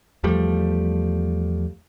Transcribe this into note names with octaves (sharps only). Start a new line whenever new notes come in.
E2 F3 G3 A3